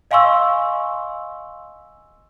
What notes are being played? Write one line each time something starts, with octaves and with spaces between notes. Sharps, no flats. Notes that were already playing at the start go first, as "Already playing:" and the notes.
D#5 F5 G#5 C6 C#6 E6